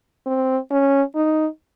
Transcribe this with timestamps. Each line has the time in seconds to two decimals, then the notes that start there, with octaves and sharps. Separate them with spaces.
0.26 C4
0.71 C#4
1.16 D#4